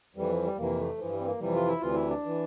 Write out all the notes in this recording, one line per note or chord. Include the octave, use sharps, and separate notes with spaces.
F2 E3 G3
F3
G3
F2 C3 E3 A#3
A3
G2 E3 F3
G3
C4
A#3
F2 C3 E3 G3
F4
E4
D2 C3 E3 F4
E4
D4
E3